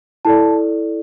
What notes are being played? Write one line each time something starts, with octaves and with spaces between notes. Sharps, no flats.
E4 A4 D5 A5